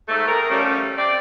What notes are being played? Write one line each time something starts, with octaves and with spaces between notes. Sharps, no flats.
G#2 A3
C4 G#4 A#4
F3 G3 A3 C#4
C4 D5